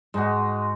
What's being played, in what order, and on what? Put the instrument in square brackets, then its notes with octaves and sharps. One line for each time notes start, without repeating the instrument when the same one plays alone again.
[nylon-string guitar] G#2 [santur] G#3 D#4 F#4